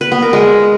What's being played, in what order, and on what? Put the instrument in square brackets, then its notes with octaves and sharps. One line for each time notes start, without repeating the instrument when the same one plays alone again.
[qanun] B4
B3
A#4
G#3